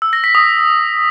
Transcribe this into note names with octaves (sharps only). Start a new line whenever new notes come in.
E6
A#6
B6
D#6